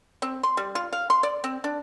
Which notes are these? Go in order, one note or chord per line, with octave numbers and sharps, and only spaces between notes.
C4
C6
G3
F4
F5
C6
D5
C4
D4